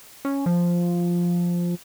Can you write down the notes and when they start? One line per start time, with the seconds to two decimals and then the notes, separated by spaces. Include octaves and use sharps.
0.25 C#4
0.46 F3